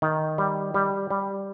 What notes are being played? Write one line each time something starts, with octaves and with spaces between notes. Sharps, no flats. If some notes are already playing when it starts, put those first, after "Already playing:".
D#3
G3
G3
G3